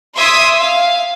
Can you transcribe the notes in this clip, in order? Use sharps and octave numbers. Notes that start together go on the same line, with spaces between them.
E5 C6 D6 D#6 G#6 B6
F5